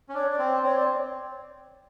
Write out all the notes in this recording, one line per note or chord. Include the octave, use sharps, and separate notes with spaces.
C#4
D4 C#5
D5
C4
C4 C#5
D5